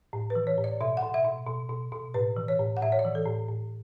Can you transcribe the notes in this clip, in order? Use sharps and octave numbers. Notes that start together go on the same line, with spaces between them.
A2
B4
E3
C#5
A2
D5
B2 E5
F#5
B2
E5
B2
B2
B2
B2
A2 B4
E3
C#5
A2
F#5
A2 E5
C#5
D5
E3
A4
A2
A2